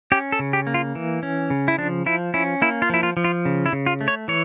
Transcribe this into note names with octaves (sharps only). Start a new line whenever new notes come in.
C#4 G4
A4
C#3
G4
A#3
F4
E3
C#4
C#3
E4
F3 D4
F3 E4
C#4 E4
A#3 E4
F4
F3 E4
F4
F3
F4
C#3
E4
C#3
F4
A3
C#5
E3 C#5